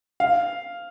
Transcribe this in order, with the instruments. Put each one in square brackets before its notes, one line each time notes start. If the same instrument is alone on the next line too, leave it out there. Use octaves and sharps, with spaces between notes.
[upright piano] F5